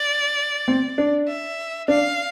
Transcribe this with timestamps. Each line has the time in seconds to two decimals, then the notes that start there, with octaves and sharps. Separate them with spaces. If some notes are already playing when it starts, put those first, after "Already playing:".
Already playing: D5
0.68 C4
0.98 D4
1.28 E5
1.88 D4 F5